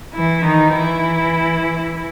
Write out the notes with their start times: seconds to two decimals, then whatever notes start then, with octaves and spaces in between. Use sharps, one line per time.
0.14 E3 E4
0.44 D#3 D#4
0.75 E3 E4